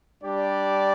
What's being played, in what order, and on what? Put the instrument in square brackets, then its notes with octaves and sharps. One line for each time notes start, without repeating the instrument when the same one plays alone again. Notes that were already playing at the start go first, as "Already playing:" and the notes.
[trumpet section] G3 D4 G4 D5